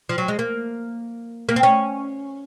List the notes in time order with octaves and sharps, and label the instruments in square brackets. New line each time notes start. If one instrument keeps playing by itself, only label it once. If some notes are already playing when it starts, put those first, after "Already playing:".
[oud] F3
F#3
G#3
A#3
A#3
C4
C#4